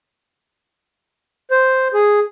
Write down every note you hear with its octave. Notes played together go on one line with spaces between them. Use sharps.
C5
G#4